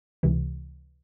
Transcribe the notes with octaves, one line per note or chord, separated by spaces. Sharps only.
C#2 C3 E3